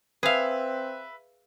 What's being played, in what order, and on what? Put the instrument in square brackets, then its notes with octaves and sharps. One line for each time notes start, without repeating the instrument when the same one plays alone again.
[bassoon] C4 [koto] G#4 F5 [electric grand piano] B4 E5